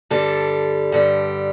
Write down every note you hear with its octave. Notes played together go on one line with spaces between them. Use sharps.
G2 D3 G3 A4
G2 D3 G3